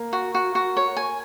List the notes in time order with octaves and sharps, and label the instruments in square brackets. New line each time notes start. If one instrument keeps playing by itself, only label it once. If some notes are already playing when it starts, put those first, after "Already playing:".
Already playing: [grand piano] A#3
[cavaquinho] F#4
F#4
F#4
C#5
G#5